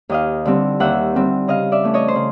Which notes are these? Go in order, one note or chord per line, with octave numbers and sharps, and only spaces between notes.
D#2 D#5 F5
D3 G3 C4
D#2 E5 F#5
D3 G3 C4
C#3 D#5 F5
D5 E5
E3 A3 C#4
C#5 D#5
C5
C#3